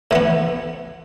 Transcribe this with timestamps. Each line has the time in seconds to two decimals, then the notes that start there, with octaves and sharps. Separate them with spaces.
0.11 A2 E3 B3